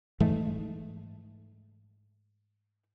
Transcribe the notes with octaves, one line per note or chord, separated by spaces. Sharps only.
G#2 E3 G#3 A3